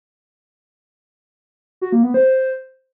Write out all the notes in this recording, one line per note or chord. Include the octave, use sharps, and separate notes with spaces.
F#4
A#3
B3
C5